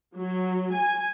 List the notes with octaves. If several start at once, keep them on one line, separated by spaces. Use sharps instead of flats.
F#3
G#5